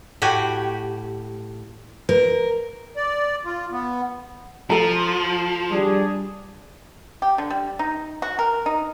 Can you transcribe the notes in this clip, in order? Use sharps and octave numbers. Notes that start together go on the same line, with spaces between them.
A2 F#4 G4 G#5
A#4 B4
D5
F4
B3
F3 A4 A#5
G3 D4 G#4
G4
D3
G3
D#4
F#4
A#4
D#4